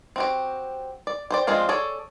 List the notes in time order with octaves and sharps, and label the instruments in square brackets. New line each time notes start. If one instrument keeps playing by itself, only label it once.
[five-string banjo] C4 F#4 G4
D5
G4 C5 D5
F3 G#3 C4 D4 F4
G#4 A4 C#5 D5